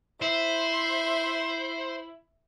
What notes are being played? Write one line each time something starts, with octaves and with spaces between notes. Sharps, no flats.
E4 C5 E5